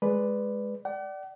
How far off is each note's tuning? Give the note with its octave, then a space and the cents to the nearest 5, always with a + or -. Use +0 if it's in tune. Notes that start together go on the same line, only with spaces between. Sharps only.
G#3 +0 B4 +5 D5 +0
D5 +0 F#5 +45